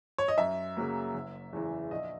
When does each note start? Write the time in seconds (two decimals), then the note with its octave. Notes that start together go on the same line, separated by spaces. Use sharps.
0.18 C#5
0.28 D#5
0.38 F#2 E5
0.77 C#3 F#3 A#3
1.14 F#1
1.53 E2 C#3 E3
1.91 A#1 D#5